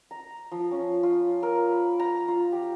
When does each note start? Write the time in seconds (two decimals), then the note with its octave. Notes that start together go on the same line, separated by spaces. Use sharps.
0.11 A#5
0.52 F3
0.71 C#4
1.03 F4
1.43 A#4
1.72 B5
2.00 A#5
2.28 F4
2.52 G4